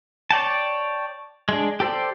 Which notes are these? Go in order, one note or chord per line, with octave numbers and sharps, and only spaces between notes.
C#5 D5 G5 A5
G#3 D4
G4 A4 C5 D5